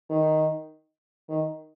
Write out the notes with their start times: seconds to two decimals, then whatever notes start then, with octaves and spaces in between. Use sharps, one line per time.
0.10 D#3
1.29 D#3